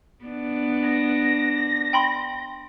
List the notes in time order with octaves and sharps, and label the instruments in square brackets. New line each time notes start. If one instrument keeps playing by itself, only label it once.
[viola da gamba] B3 D4
[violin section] A#6
[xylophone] G5 B5 C6